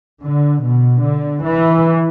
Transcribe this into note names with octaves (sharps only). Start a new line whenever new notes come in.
D3
B2
D3
E3